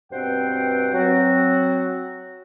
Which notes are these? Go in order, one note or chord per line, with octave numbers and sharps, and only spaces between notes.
G2 B2 C4 C5 F#5 G5
F#3 C4 F#4